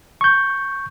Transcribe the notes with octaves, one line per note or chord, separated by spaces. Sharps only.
C#6 G6